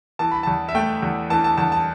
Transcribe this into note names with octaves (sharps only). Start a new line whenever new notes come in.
E3 A5
B5
E2 A5
E5
A3 G5
E2
E3 A5
A5
E2 A5
A5